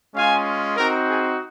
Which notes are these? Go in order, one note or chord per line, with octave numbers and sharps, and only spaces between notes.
G#3 C#4 F4 F5 G#5
C4 D#4 F#4 A#4
G#4